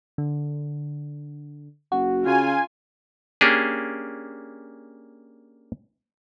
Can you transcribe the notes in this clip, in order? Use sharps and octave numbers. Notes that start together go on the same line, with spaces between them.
D3
F#1 F#4
C#3 F4 G#5
A#3 C#4 D4 G4 G#4